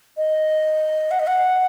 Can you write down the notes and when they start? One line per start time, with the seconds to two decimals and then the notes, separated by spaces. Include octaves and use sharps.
0.17 D#5
1.11 F#5
1.19 D#5
1.27 F#5